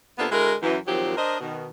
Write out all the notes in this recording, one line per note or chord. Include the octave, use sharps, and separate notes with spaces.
C3 A#3 B3 D4 F4 A4
D3 G#3 E4 F#4 A#4
F#2 E3
A#2 D#3 F3 F#3 C4 G4
D4 A#4 C5 D#5
B2 D#3